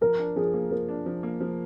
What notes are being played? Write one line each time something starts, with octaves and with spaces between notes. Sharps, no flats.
F3 A#4
D4
F3 G#4
A#3
F3 A#4
D4
F3
A#3
F3